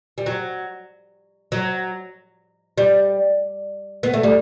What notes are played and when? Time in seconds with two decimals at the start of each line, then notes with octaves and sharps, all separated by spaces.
0.18 G3
0.26 F#3
1.52 F#3
2.78 G3
4.03 B3
4.13 A3
4.23 G3